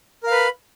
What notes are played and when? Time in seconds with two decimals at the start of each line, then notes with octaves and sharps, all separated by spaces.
0.23 A#4
0.27 F5
0.31 B4
0.35 B5